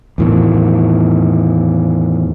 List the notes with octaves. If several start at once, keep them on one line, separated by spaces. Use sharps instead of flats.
E2 A2 D#3